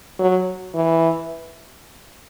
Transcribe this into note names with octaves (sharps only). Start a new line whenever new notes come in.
F#3
E3